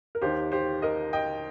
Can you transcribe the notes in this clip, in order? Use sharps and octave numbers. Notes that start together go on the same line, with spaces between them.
A#4
D#2 D#3 G4 C5
G4 C5
A#4 D#5
D#5 G5